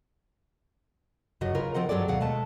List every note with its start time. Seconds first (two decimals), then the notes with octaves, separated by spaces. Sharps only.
1.41 F#2 C#3 F#4 D#5
1.55 C#3 F4 A#4 B4
1.74 F3 C4 A#4 C5 D#5 F#5
1.89 G2 F#3 G#4 A4 D5
2.08 D#2 B2 F5 F#5
2.21 B2 G#3 A3 A5